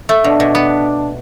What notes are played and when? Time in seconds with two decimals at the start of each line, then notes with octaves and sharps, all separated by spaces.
0.09 A3
0.24 B2 D4
0.40 B2
0.55 B3